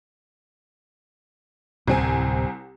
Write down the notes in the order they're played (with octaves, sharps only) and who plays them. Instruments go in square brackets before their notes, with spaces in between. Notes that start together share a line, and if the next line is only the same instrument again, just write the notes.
[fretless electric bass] D1 C3 [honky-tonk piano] C2 C4 G#5